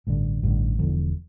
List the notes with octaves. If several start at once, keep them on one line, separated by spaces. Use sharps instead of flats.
A1 G2 D3
A1 G2 D3
E1 E2 D3 F3